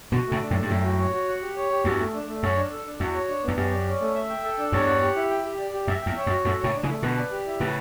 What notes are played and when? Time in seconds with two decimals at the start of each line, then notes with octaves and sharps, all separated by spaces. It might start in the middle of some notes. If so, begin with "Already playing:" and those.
0.12 B2 D3 F#4
0.27 A2 C#3 A3
0.42 D4
0.51 F#2 A2
0.55 A3
0.62 G2
0.70 F#2 A2 G5
0.84 F#4
0.98 C#5
1.13 F#4
1.28 F#5
1.42 G4
1.56 C#5
1.70 G4
1.84 E2 G2 F#4
1.99 A3
2.14 D4
2.28 A3
2.43 F#2 C#5
2.56 D4
2.71 A4
2.86 D4
3.00 E2 F#4
3.14 C#5
3.29 D4
3.43 E2 B3
3.57 F#2 G4
3.72 D5
3.86 C#4
4.01 A3
4.14 E5
4.29 G5
4.44 A4
4.58 D4
4.72 E2 G2 C#5
4.87 F#5
5.01 G4
5.16 E4
5.30 G5
5.45 G4
5.59 D5
5.73 G4
5.87 F#2 E5
6.02 E2 G5
6.16 C#5
6.26 F#2
6.31 F#4
6.45 F#2 A2 A4
6.60 A2 C#3 C#5
6.74 D4
6.83 C#3 E3
6.88 A3
7.03 B2 D3 B4
7.17 D5
7.31 G4
7.46 E4
7.60 A2 C#3 B4